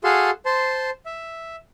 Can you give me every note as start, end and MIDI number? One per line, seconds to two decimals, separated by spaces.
0.04 0.30 66
0.04 0.30 68
0.04 0.30 69
0.04 0.30 77
0.04 0.30 81
0.04 0.30 84
0.46 0.90 72
0.46 0.90 81
0.46 0.90 84
1.06 1.56 76